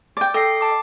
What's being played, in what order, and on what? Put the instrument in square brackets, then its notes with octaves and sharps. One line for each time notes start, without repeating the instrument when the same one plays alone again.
[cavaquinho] D5 G5
[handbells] A4 G5 C7 [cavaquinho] D#5
[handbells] A5 D6